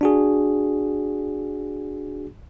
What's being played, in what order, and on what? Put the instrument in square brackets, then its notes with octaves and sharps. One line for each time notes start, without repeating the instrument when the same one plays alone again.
[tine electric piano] D4 F#4 G#4